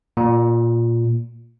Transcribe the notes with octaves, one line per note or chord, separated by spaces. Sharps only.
A#2